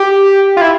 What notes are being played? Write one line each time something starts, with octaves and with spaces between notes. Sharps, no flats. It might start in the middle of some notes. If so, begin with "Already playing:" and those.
Already playing: G4
F4
E4